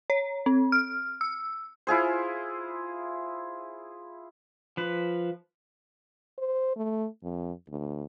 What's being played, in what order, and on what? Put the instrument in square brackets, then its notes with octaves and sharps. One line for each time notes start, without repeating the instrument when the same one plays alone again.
[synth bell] C#5
C4
F6
E6
[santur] E4 F4 G#4 C5
[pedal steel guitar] F3 B4
[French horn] C5
A3
F2
D2